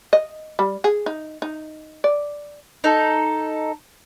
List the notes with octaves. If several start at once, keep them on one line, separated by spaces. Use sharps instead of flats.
D#5
G3
G#4
D#4
D#4
D5
D#4 A4